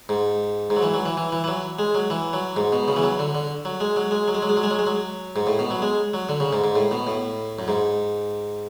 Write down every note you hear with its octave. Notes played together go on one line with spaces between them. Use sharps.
G#2
G#2
F#3
E3
F#3
E3
E3
E3
E3
F#3
G#3
F#3
E3
F#3
G#2
B2
C#3
E3
F#3
D3
D3
F#3
G#3
F#3
G#3
F#3
G#3
F#3
G#3
F#3
G#3
F#3
G#3
F#3
G#2
A2
B2
F#3
G#3
F#3
D3
C#3
G#2
G#2
A2
B2
A2
F#2
G#2